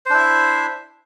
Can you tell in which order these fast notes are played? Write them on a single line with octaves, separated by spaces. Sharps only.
C5 D4 E4 E5